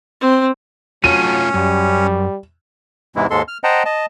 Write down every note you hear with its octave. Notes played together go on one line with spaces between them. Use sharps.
C4
F#3 A3 C#4 F4 A4 D#7
F#2 G3
E2 G#2 C3 E3 G#3 E4
D#2 G#2 G#3 A4 C6
F6
C5 D#5 F#5 G5 A5 A#5
D#5 A5